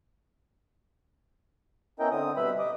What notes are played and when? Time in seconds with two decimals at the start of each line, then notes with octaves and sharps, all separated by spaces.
1.99 B3 C#4 E4 A#4 D#5 G5
2.11 D3 C4 D#6
2.37 B2 G3 B4 E5 B5
2.59 D#5 D6 D#6